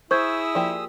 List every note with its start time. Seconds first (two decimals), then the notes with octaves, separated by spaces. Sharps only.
0.11 E4 G#4 C5 C#6 D#6 E6 G6 G#6
0.55 F3 A#3 G4 D5